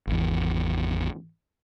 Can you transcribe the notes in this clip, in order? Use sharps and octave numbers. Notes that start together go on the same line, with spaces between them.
G#1 E2